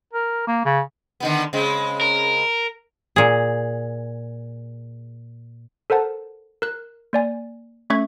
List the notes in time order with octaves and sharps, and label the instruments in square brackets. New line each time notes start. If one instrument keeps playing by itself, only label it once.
[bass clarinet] A#4
A#3
C#3
[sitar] D3 D#3 B3
C#3 G#3 C4
[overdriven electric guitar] A#4
[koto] A#2 G#4
[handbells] A4 A#4 C5 F#5 A5
A#4 F#6
A#3 D5 G#5
A3 C#4 E5 C#6 G#6